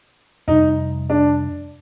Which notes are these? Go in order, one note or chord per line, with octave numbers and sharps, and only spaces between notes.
F2 C3 G3 D#4
D4